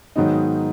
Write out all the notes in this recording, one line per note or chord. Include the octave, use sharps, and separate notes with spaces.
G#2 D#3 F#3 B3 D#4